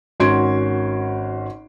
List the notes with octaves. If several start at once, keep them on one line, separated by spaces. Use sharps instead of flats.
G#1 C#4 F#4 C6 G#6 D7